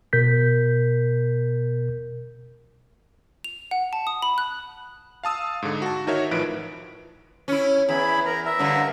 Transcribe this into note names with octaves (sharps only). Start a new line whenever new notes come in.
B2 A#4 G6 B6
F7
F#5
A5
D#6
B5
F#6
F5 A5 D#6 E6
G#2 D3
F#4 A5
D#3 D#4 F#4 A#4 C#5 E5
A1 E3 F3 B4 D7
C#4 E4
E2 E4 G#4 B5
A#4 A#5
A#4 E5
G2 D3